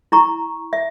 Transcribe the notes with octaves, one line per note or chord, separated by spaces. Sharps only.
E4 A#5 C#6
E5